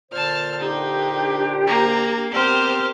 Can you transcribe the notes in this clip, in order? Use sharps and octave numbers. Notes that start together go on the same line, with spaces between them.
A#2 D3 C5 A5 F6
D4 D#4 G4
A#3 A#5
G3 B3 C4 G4 A#4 C5 F6